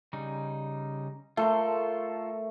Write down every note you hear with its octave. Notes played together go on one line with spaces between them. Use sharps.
C#3 G3 D#4
A3 F4 A4 A#4 C6